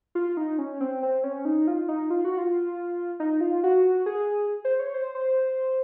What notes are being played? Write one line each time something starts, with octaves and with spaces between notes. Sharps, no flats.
F4
D#4
C#4
C4
C4
C#4
D#4
F4
D#4
F4
F#4
F4
D#4
F4
F#4
G#4
C5
C#5
C5
C5